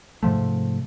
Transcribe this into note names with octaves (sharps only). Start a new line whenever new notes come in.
G#2 C3 F3 A3